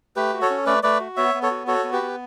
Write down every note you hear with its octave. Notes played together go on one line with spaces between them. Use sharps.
A3 G4 B4
F#4
A4 C#5
C#4
A3 B4 D5
A3 B4 D5
F#4
B3 C#5 E5
B3
A4 C#5
F#4
F#4 A4 C#5
B3
G4 B4
B3